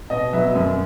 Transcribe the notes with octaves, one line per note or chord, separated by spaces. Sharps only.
B2 D#5
F#3 B3 E5
F#2